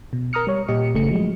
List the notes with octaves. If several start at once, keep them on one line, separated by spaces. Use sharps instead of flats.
B2
A#4 A#5 D#6 F6 C#7
G3 C#5
A#2 G4 D#5 C#7
G1 C#3 A3 C#7
F3 F#3 G#3